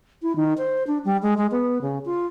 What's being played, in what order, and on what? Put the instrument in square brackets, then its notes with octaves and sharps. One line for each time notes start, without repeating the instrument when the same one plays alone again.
[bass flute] E4
D#3
C5
D4
G3
G#3
G#3
B3
C#3
F4